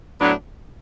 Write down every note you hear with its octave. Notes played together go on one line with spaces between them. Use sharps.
A2 F#3 B3 D4